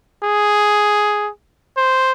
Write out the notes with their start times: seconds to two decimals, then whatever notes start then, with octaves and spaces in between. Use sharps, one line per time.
0.23 G#4
1.77 C5